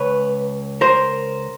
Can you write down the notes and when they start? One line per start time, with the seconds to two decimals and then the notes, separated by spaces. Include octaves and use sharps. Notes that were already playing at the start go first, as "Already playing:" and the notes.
Already playing: C#2 B4 C#5
0.81 A#4 C5